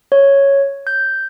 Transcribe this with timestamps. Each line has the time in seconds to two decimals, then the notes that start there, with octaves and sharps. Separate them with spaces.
0.12 C#5
0.87 G6